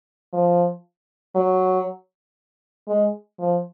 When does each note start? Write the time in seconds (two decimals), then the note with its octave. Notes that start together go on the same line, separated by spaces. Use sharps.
0.33 F3
1.36 F#3
2.88 G#3
3.39 F3